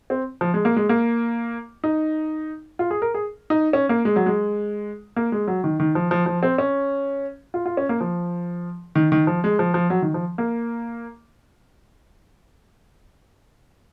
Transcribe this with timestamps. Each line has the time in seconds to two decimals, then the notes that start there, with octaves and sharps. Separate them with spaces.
0.10 C4
0.41 F3
0.54 G#3
0.65 A#3
0.76 G#3
0.89 A#3
1.84 D#4
2.79 F4
2.91 G#4
3.02 A#4
3.14 G#4
3.50 D#4
3.73 C#4
3.89 A#3
4.05 G#3
4.16 F#3
4.26 G#3
5.16 A#3
5.32 G#3
5.48 F#3
5.64 D#3
5.80 D#3
5.95 F3
6.11 F3
6.26 F3
6.43 C4
6.58 C#4
7.54 F4
7.66 F4
7.77 C#4
7.89 A#3
8.01 F3
8.95 D#3
9.12 D#3
9.27 F3
9.44 G#3
9.59 F3
9.74 F3
9.90 F#3
10.02 D#3
10.14 F3
10.38 A#3